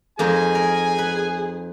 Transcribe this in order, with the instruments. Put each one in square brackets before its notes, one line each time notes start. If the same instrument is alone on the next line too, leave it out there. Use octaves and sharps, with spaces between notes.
[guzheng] F2 A#3 D#4 [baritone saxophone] G#4 [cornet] G#5
[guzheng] A#4
B4